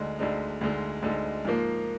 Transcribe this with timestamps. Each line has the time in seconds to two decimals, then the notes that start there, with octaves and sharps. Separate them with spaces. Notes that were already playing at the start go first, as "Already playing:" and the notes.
Already playing: D2 D3 G#3 D#4
0.19 D2 D3 G#3 D#4
0.61 D2 D3 G#3 D#4
1.02 D2 D3 G#3 D#4
1.45 G#2 F3 A#3